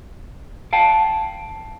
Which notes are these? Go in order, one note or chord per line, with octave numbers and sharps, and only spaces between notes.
F5 G5 A5